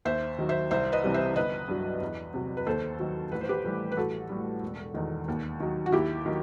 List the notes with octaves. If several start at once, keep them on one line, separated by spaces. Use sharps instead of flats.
D#2 C5 E5
D#3 F#3
C5 E5
C2 C5 E5
B4 D#5
C3 E3 G3
C5 E5
G1 B4 D#5
G2 F#3
E2
C3 F#3
B4
D#2 A4 C5
D#3 F#3
A1 B4
C5
G4 B4
A2 E3 G3
B4
A1 F#4 A4
A2 G3
E1
E2 D#3
D#2
D#3 F#3
F#4
D#2 E4 G4
D#3 F#3